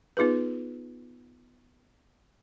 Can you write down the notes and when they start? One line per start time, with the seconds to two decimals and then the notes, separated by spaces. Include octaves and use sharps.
0.17 B3 D#4 F4 G#4 B4